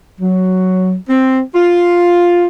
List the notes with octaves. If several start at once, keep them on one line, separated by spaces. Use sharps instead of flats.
F#3
C4
F4